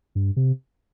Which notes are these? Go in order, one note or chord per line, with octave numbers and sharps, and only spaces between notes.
G2
C3